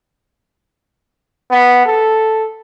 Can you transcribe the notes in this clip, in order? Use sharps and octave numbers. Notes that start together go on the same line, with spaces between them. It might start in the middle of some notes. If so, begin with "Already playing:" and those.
B3
A4